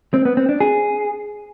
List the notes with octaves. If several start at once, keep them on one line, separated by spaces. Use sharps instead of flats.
C4
B3
C4
D4
G#4